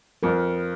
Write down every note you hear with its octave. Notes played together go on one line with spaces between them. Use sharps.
F2 A#4